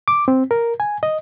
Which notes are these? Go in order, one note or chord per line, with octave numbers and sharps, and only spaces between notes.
D6
C4
A#4
G#5
D#5